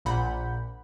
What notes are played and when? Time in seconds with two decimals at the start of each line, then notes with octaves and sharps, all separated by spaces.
0.05 A#1 A#2 F#5 B5 G6